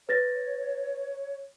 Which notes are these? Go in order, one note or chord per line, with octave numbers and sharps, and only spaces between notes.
B4 C#5 A6 A#6